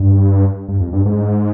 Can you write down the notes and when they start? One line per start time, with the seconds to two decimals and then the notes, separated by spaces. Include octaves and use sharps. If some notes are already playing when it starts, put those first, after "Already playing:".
Already playing: G2
0.68 G2
0.80 F2
0.93 G2
1.05 G#2